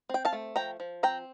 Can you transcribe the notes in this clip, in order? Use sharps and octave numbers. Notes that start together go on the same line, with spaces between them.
C4 G5
F5 A5
A3
F3 G5 A#5
F3
C4 G5 A#5